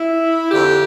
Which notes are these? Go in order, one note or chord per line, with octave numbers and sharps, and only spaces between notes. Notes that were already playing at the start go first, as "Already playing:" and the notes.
Already playing: E4
F2 D3 G4